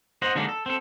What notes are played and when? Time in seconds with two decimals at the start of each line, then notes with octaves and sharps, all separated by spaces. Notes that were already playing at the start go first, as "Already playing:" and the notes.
0.22 C5 D#5 F#5
0.35 D3 F#3 G#3 A#3 D4 D#4
0.49 A4
0.66 C4 A4